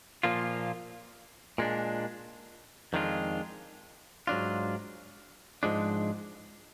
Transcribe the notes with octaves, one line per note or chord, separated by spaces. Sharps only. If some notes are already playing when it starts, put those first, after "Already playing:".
A#2 F3 A#3 F4
A#2 G#3 D4
F2 D#3 G#3 D4 F4
G#2 F#3 D4 F4
G#2 F3 G#3 D4